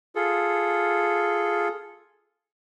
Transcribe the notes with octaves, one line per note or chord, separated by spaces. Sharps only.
F4 G#4 A4